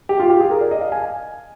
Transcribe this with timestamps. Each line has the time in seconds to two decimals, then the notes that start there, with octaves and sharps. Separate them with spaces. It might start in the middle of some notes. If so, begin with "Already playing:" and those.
0.09 G4
0.20 F4
0.30 G4
0.40 G#4
0.50 A#4
0.61 D5
0.71 D#5
0.81 F5
0.92 G#5